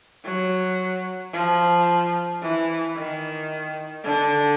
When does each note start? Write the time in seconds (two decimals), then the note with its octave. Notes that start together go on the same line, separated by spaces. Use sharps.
0.25 F#3
1.33 F3
2.42 E3
2.96 D#3
4.04 D3